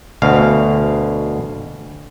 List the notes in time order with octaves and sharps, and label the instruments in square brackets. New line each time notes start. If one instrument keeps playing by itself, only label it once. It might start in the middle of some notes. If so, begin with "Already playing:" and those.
[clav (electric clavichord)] D2 B2 F5